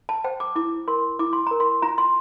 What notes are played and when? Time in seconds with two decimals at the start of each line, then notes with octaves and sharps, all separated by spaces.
0.09 A5
0.24 C5 G5
0.40 D6
0.56 E4 D6
0.88 A#4 C6
1.19 E4 D6
1.33 C6
1.47 A#4 A#5
1.60 C6
1.82 F4 A#5
1.98 C6